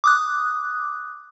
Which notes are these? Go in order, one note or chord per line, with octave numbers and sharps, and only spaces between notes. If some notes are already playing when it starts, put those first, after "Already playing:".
D6 D#6 F#6